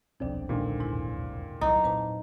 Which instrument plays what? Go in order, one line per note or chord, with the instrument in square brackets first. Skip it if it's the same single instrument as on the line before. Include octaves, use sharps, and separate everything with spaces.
[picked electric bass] D#1 B1 C4 [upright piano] F2 D5 [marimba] F3 D4
[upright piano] A#2 D3 D#3 [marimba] G#3
[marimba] E2 G#2 E4
[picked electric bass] C2 [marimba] F#3 E4 D6 [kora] D#4
[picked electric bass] A#2 C4 [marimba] B4 A5 D6